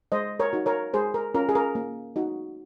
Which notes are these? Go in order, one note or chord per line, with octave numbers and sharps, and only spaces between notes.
G#3 C5 D#5
A#4 C#5
D#4 F#4
A#4 C#5
G#3 G#4 C5
A#4
C#4 F4 A#4
G#4
A#4
A#3
D#4 F#4